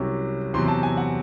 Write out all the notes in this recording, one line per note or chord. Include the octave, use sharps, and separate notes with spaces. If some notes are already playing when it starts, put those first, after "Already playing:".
Already playing: C2 C3 F#3 C#4
E2 C3 F#3 C4 C6
C6
A5
G#5
F#5